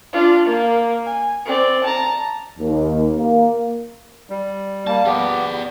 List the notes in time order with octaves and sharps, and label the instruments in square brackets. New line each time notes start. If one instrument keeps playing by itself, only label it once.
[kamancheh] D4 F4
A#3
G#5
C4 D5
A5 A#5
[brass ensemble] D#2
A#3
[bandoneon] G3
[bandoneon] G3 A#3 [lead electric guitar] A5
[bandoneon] B3 G4 [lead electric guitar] G#4 D5